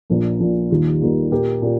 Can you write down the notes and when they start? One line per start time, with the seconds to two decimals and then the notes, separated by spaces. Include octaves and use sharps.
0.10 A#1 A#2 F3 A#3
0.40 A#1 A#2 F3 A#3
0.70 D#2 D#3 G3 A#3 F4
1.01 D#2 D#3 G3 A#3 F4
1.31 A#2 A#3 G4 A#4
1.62 A#2 A#3 G4